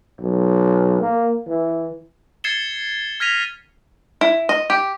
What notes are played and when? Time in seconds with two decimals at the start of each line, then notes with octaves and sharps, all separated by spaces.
0.21 B1
1.01 A#3
1.47 E3
2.44 G#6 A6 C7 C#7 E7 G7
3.20 F6 G#6 A#6 B6 D#7 F7
4.21 E4
4.49 D#5
4.70 G4